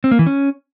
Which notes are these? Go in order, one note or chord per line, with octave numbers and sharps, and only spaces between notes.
C4
A#3
E3
C#4